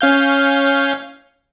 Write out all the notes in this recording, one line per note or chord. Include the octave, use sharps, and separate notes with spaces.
C#4 F5 G6